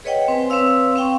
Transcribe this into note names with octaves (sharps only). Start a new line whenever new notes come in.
G#4 B4 C#5 D#5 F#5 G5
C4 B4 C5 G#5
C4 B4 C#5 F5 E6
C4 F5 G5 C#6